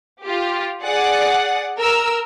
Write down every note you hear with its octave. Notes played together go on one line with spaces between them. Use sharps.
F4 G4
G#4 D5 F#5
A#4 E6